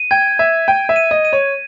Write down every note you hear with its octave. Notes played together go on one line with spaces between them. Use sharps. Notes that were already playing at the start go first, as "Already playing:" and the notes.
Already playing: D#7
G5 G#6
E5 G#6
G5 D#7
E5
D#7
D#5
D#7
C#5